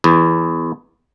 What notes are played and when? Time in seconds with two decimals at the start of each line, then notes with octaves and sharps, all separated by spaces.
0.04 E2